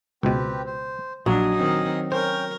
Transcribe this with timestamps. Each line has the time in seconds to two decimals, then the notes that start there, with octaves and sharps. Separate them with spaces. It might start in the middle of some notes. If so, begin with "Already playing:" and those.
0.23 C#2 B2 C4 G4 B4
0.66 C5
1.26 A#1 F#3 D4 D#5 G#5 D#6
1.55 D#3 C4 D#4
2.12 C#4 A#4 C5 G5